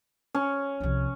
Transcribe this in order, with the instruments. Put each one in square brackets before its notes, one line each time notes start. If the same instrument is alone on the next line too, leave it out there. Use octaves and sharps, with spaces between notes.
[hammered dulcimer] C#4
[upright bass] C2 F3